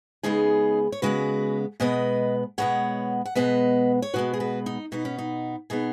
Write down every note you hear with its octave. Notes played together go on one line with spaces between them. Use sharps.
C#3 G#3 B3 D#4 G#4
C#5
C#3 G#3 B3 F#4 B4
B2 G#3 B3 B4 D#5
B2 G#3 B3 C#5 F#5
F#5
B2 G#3 B3 B4 D#5
C#5
B2 G#3 B3 F#4 B4
G#4
F#4 B4
D#4
B2 B3 D#4
C#4
D#4
B2 B3 D#4 G#4